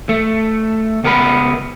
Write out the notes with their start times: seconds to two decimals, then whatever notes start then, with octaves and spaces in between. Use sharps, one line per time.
0.09 A3
1.04 C#2 B3 A#4 A5 B5